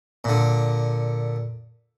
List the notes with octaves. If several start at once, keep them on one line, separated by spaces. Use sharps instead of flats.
A#2 D3